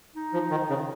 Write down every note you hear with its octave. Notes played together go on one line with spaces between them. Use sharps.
D#4
F3
D#3
C#3